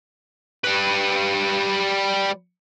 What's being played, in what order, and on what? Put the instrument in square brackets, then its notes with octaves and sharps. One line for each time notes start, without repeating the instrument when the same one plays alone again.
[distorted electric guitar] G3 B4